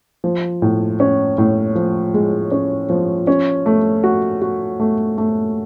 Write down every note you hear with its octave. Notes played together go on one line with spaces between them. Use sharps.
F3
A2
C#4
A2
F3
G#3
C#4
F3
C#4
A3
F#4
F#4
A3
A3